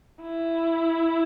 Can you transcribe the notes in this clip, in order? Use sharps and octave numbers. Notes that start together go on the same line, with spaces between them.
E4